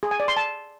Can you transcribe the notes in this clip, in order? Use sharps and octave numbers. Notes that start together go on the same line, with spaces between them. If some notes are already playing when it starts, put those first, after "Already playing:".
G#4
G#5
D5
C6
A5